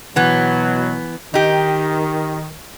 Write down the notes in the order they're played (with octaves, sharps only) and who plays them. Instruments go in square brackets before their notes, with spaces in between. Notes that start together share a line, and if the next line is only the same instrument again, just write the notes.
[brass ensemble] B2 F#3 [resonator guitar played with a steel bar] E3 B3
[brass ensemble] D#3 [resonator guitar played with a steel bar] D#4 G4